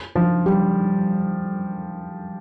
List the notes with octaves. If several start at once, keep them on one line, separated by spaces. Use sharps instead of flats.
F3
G3